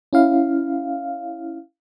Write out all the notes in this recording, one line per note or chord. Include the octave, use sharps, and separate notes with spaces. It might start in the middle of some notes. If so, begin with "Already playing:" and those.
C#4 E4 F5